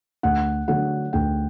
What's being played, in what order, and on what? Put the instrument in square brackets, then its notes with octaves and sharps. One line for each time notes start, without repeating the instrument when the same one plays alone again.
[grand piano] D2 [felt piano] F#5
[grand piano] D3 F#3 A3 [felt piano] F#5
[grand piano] D2 [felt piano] G5